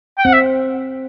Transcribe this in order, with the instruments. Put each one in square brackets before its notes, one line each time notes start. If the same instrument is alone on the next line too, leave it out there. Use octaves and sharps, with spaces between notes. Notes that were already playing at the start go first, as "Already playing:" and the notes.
[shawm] G5
[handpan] C4 [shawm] F#5
[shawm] E5